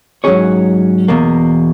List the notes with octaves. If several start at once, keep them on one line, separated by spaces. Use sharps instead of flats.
G#2 F#3 C#4 G#4 C#5
E2 B2 A#3